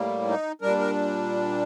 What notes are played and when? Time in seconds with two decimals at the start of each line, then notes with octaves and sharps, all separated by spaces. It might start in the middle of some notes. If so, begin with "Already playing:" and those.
Already playing: A2 G3 A#3
0.28 D#4
0.61 A#2 G3 D4 A#4
0.79 A#4